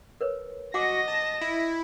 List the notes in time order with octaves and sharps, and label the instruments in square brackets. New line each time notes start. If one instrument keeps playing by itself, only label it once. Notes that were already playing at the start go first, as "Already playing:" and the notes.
[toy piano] A#4 B4 C#5
[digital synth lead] F#4 [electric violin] D#5 A#6 [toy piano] F#5 G#5 D6
[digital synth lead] A5
E4